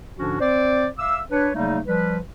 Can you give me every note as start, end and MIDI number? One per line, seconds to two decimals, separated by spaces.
0.17 0.37 44
0.17 0.37 50
0.17 0.37 53
0.17 0.37 61
0.17 0.37 62
0.17 0.37 66
0.40 0.87 60
0.40 0.87 72
0.40 0.87 74
0.98 1.20 76
0.98 1.20 77
0.98 1.20 86
0.98 1.20 88
1.31 1.50 62
1.31 1.50 71
1.31 1.50 73
1.54 1.80 49
1.54 1.80 54
1.54 1.80 55
1.54 1.80 57
1.54 1.80 58
1.54 1.80 63
1.86 2.18 53
1.86 2.18 55
1.86 2.18 71